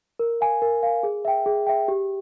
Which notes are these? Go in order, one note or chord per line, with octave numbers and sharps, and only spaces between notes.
A#4
F5 G#5
A#4
F5 G#5
G#4
E5 G5
G#4
E5 G5
G4